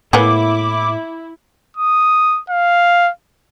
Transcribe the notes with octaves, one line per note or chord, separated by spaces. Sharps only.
A2 A#3 B3 E4 G#4 D6
D#6
F5